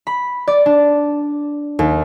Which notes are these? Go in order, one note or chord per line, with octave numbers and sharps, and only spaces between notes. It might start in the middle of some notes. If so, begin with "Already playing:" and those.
B5
D5
D4
D#2